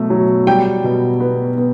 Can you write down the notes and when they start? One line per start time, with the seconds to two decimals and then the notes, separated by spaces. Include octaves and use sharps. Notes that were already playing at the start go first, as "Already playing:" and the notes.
Already playing: B2 F#3 A3
0.10 F#3
0.47 G3 G5
0.84 B2
1.20 B3
1.58 B3